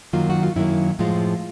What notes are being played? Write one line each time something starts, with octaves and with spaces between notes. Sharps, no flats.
F#2 D#3 F#3 A#3 F4
F#4
F4
F#2 D#3 F#3 A#3 E4
A2 F3 G#3 F4